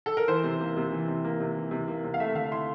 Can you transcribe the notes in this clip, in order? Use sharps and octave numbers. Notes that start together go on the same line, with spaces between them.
A4
A#4
E3 C5
C3
A#3
C3
E3
C3
A#3
C3
E3
C3
A#3
C3
F5
A3 E5
D3 F5
E4 C6